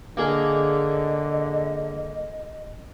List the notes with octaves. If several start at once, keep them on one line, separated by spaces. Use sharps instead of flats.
D3 A#3 G#4 A#4 D#5